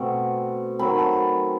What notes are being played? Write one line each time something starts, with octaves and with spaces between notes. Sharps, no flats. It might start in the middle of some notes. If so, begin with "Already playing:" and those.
Already playing: B2 A3 C4
D#3 F#3 C4 B5
A5